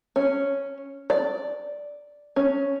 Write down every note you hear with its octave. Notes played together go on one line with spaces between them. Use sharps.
C#4
D5
C#4